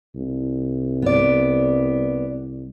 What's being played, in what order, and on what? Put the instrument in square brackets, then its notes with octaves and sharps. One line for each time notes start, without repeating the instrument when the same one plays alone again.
[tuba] C2
[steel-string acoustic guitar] B3 D5